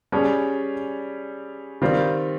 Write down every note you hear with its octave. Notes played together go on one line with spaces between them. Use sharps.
G3 C#4 G#4
D#3 G3 C4 F4